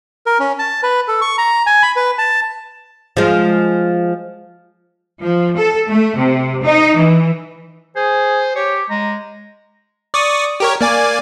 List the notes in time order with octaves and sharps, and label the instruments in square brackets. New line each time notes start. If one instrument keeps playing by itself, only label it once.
[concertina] A#4
C#4
A5
B4
A4
C#6
A#5
G#5
B5
B4
A5
[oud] F3 G#3
[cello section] F3
A4
A3
C3
D#4
E3
[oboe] G#4 [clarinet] C5
[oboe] G4 [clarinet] C#5
[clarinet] G#3 [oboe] A#5
[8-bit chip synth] D5 C#6 D#6
G4 A#4 C#5
A#3 D5 G#5